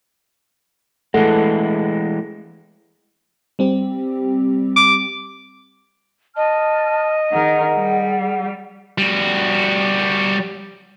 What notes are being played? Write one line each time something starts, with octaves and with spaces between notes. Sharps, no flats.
E3 G#3 A3 A4 F#5
G3 C4 G4
D6
D#5 A5 F6
D#3 G#4 A#4 F#5
G3
G3 F#4